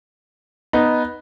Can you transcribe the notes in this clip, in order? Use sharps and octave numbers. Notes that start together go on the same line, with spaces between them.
B3 D#4